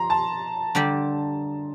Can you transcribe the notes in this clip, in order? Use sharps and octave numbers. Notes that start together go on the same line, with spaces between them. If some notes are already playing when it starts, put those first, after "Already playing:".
Already playing: F3 A#5 C6
A5
D3 G3 D4 G4 D5